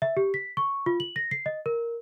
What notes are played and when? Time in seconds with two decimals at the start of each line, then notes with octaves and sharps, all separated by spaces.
0.02 E5
0.17 G4
0.34 B6
0.57 C#6
0.86 F4
1.00 F#7
1.16 A#6
1.31 C7
1.46 D#5
1.66 A#4